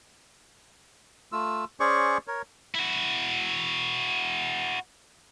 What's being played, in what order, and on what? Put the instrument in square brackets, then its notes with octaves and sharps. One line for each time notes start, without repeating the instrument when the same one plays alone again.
[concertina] A3 F4 E6
C#4 G#4 C5 D5 C#6
A#4 C#5
[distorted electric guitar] E4 F#4